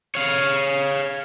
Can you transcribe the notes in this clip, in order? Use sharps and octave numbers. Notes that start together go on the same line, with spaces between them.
C#5 F5